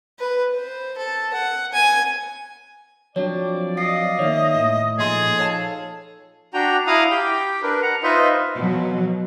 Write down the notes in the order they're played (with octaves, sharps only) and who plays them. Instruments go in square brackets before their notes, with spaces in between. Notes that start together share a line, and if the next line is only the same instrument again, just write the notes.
[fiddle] B4
C5
A4
F#5
G#5
[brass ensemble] F3 D5 [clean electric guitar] F#3 C4 D4 [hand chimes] C#5
[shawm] D#5 [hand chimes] F5 C7
[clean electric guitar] D#3 A#3 [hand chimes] C#5 E5
[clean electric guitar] A2
[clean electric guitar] A#2 C6 [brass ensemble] F3 D#4 A4 [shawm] G#4 [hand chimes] D#5
[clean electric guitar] C#5 F5 A5
[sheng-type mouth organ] D4 F#4 G5 A#5
E4 F5 A#5 D#6
G4 G5
D4 A#4 B4
F#5 A#5
D#4 F4 B4 C5 D#5 E5
[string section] B2 F3 F#3